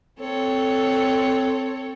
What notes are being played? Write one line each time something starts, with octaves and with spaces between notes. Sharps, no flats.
C4 A4 C#5